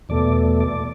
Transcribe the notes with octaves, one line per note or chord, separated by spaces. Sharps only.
E2 B2 A3 D5
D5